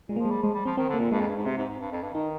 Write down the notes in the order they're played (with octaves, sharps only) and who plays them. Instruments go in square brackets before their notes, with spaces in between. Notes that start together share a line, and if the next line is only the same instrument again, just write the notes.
[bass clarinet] A#2 [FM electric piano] G#3
[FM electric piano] A#3
[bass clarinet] F3
[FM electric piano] G#3
[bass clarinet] G3
[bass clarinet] F3 [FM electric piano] G#3
[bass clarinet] G3
[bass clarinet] F3 [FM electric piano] C4
[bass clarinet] D#3 [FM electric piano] C4
[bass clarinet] D3
[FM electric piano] A#3
[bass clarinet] A#2
[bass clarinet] G2 [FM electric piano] G#3
[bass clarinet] F2
G2
G#2
[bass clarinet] C3 [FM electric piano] C4
[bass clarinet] G#2
G#2
G2
F2
G2
[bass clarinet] D#3 [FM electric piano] D#4